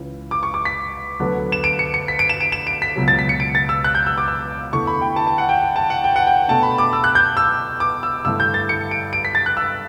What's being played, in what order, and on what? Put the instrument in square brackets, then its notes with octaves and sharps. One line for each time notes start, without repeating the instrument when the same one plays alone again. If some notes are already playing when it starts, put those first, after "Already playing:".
Already playing: [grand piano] C#2 C#3 E3
D6
C#6
D6
B6
D2 D3 F#3 B3
E7
D7
C#7
C#7
B6
D7
E7
D7
E7
D7
B6
C#2 B2 F#3
A6
B6
C#7
D7
A6
E6
F#6
G6
E6
D6
E6
E2 D3 A3 E4 C#6
B5
G5
A5
A5
F#5
G5
G5
A5
F#5
G5
F#5
G5
B2 A3 D4 A5
B5
D6
E6
F#6
G6
E6
D6
E6
G2 D3 A3 E4 E6
G6
A6
C#7
D7
D7
B6
A6
F#6
E6